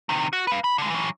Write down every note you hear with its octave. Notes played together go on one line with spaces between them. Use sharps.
C3 D#3
F#4
B4 F5
B5
D3 G#3
E3 F#3